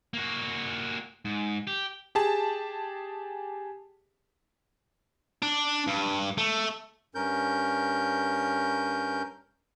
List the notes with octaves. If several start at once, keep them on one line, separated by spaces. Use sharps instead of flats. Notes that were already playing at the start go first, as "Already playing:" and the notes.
A#3 F#4
G#2
G4
G4 G#4 A5
D4
G2
A3
G2 C#4 A#4 G6